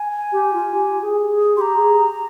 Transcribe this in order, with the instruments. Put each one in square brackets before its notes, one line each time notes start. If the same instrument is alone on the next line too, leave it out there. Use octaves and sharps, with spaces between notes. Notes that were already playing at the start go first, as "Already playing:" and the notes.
Already playing: [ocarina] G#5
[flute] G4
F4
G4
G#4
G#4
[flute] G4 [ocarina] C6
[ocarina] A#5
[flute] G#4